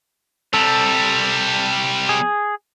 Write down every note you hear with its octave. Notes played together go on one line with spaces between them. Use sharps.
C3 G3 A4
G#4